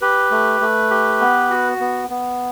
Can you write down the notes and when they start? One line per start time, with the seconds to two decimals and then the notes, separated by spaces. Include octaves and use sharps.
0.01 G4 B4
0.31 A3
0.61 A3
0.90 G4
1.20 B3
1.50 F#4
1.80 B3
2.10 B3